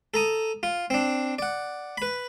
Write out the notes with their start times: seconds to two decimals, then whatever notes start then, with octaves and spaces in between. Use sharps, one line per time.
0.14 A4 A#5 D#6
0.63 F4
0.90 C4 D4
1.39 D5 F#5
1.98 B4 B5